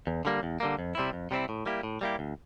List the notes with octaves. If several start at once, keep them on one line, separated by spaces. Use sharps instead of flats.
E2
D3 G3 A#3
E2
D3 G3 A#3
F2
C3 G3 C4 E4
F2
C3 G3 C4 E4
A2
G3 A#3 E4 G4
A2
G3 A#3 E4 G4
D2